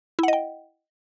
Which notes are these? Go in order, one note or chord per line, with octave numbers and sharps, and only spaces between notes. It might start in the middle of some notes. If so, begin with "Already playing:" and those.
E4 D#5 F#5 G5